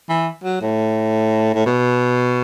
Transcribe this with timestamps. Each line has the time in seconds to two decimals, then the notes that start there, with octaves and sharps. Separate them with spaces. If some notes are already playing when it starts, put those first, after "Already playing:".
0.09 E3
0.44 F#3
0.61 A2
1.54 A2
1.66 B2